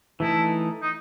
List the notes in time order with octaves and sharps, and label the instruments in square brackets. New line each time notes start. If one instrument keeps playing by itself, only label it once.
[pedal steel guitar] E3 A3 D#4 A4 [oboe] E4
[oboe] D#4